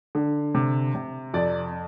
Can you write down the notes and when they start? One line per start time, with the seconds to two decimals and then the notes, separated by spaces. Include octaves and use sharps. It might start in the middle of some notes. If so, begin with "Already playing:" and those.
0.15 D3
0.55 C3
0.95 C3
1.34 F2 D5